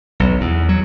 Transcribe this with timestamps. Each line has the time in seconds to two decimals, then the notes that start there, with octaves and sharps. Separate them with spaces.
0.20 B1
0.41 E2
0.69 F#3